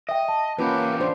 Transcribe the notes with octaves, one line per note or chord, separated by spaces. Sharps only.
D#5 E5 G5
A5
E2 A#3 C#4 F4 G4 B4 F#5
D4 C5